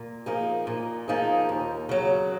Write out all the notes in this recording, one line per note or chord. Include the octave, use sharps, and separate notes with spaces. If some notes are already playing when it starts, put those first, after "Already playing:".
Already playing: A#2
F3 A#3 D#4 G#4
A#2
F3 A#3 D#4 G#4
D#2
C#3 F#3